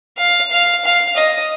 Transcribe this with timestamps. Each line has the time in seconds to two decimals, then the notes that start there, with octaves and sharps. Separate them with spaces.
0.17 F5
0.51 F5
0.84 F5
1.16 D#5